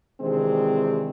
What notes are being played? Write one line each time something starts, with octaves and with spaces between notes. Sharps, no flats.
C3 D#3 E3 G#3 C4 D4